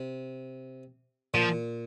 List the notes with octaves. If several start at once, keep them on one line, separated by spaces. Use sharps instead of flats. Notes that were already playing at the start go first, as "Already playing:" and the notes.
Already playing: C3
A#2 F3